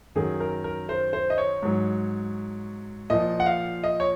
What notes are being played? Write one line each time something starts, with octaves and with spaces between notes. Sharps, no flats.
F#2 D#3 F#3 G#4
A#4
A#4
C5
C5
D#5
C#5
G#2 F#3
A#2 F3 D#5
F#5
F5
D#5
C#5